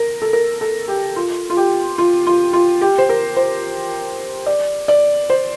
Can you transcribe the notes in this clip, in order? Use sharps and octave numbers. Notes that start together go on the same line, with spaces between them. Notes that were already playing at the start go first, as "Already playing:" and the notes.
Already playing: A#4
A4
A#4
A4
G4
F4
F4
G4
F4
F4
F4
G4
C5
A#4
C5
D5
D5
C5